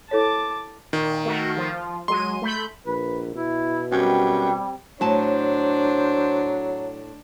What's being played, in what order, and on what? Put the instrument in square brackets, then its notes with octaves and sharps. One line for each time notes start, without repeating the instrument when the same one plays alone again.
[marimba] E4 A4 C#5 [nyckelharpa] A5 D6
[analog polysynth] A#2 [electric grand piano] D#3
[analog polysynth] A3 F#4 A#4
F3 F4
[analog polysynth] F#3 G#3 D#7 [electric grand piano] C6
[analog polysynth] A3 B5 G6
[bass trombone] A#1 [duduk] B4
[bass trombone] B2 [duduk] E4
[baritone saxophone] F#2 [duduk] G3 [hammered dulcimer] C4 G4 G#5
[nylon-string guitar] A2 A5 [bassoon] F#3 [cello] D4 [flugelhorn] C5